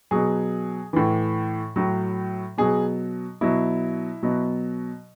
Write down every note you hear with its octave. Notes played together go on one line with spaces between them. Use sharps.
B2 F#3 G#4
A2 E3
A2 F#3
B2 F#3 G#4
B2 F#3 E4
B2 F#3